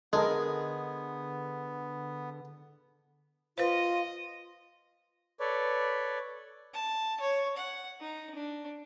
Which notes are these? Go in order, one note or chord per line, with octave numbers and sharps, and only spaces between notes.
D3 G#3 B3 A4 A#4 D#5
F4 B4 C5 D#5 F5
A4 B4 C#5 D5
A5
C#5
F#5
D#4
D4